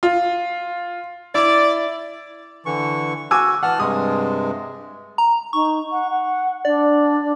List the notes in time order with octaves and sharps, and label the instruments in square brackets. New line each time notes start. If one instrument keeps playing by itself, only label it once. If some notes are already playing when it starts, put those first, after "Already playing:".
[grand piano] F4
[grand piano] E4 [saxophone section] D5
[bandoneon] D3 E3 C#6
[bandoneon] F#4 [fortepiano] G#5 D6 E6
[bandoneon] E3 A5 F6 [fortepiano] F#5
[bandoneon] G2 C3 G#3 [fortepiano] D#6
[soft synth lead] A#5
[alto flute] D#4 [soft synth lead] C#6
[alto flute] F#5
F#5
[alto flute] D4 [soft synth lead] D5